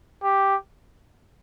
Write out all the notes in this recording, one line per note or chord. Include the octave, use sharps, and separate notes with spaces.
G4